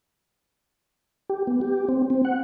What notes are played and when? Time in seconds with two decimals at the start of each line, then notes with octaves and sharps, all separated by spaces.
1.29 G4
1.47 B3
1.61 G4
1.89 C4
2.10 C4
2.25 F#5